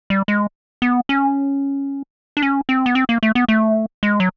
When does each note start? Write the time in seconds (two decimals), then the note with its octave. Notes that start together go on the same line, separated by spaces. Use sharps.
0.10 G3
0.28 G#3
0.82 B3
1.09 C#4
2.37 D4
2.42 C#4
2.69 C4
2.86 B3
2.95 C4
3.09 A#3
3.23 A3
3.35 B3
3.48 A3
4.03 G#3
4.20 F#3